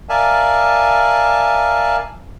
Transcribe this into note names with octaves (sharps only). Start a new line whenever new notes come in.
A#4 D5 E5 F5 G#5 A5